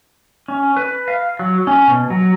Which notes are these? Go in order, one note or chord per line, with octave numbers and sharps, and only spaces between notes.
C#4
B4
F5
F#3
C#4
B2
F#3